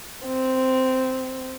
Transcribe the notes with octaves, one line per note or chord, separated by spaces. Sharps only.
C4